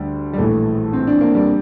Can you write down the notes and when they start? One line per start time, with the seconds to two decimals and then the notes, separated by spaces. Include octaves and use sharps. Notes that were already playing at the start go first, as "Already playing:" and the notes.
Already playing: D2 D3 G3
0.33 G3
0.38 A#1 A2 E3 A3
0.93 C4
1.07 D4
1.21 A#3
1.35 G3